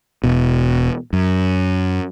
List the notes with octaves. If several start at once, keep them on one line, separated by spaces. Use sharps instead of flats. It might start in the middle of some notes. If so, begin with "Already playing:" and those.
E1 B2
F#2